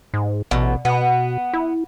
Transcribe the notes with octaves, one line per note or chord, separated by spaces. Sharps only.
G#2
A1 B2
B2 B3
E4